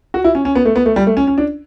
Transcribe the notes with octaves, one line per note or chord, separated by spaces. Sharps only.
F#4
E4
C#4
C#4
B3
A3
B3
A3
G3
A3
C#4
C#4
D4